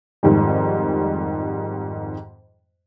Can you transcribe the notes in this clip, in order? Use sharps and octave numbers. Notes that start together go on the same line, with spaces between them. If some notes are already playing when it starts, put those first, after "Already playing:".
F2 G#2 D#3 G3